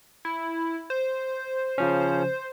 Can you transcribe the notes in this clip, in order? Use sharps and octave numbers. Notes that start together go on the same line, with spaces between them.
E4
C5
C#3 F3 C#4